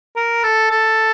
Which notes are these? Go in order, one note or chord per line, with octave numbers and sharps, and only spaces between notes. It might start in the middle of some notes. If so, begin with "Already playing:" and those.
A#4
A4
A4